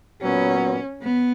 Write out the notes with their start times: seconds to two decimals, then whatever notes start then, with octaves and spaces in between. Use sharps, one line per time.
0.22 A#2 F#3 B3 C#4
1.02 B3